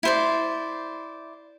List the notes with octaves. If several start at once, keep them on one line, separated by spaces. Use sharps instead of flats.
E4 C5 D5